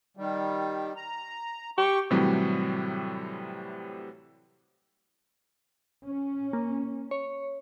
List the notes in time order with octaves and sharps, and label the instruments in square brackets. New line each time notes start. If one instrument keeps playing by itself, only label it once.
[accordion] D#3 G3
A#5
[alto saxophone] G4 [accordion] C#6
[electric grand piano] A2 C3 E3 F#3 G3
[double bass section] C#4
[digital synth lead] A#3
C#5